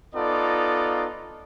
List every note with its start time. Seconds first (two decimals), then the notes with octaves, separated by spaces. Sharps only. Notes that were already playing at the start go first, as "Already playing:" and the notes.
0.15 B3 D#4 F4 A4 D5